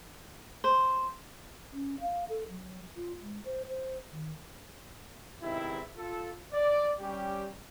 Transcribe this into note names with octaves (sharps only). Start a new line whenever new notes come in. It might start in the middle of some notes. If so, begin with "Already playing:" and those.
C5
C#4
F5
A4
F#3
F4
G#3
C5
C5
D#3
E2 G#2 C3 D#3 C4 E4
F4 A4
D5
G3 C#4 G4